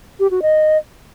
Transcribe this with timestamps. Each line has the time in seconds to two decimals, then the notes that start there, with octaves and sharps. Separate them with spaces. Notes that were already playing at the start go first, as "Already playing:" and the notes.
0.20 G4
0.31 F#4
0.42 D#5